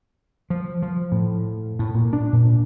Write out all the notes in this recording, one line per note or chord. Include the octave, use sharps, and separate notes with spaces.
F3
F3
A2
A2
A#2
D4
A#2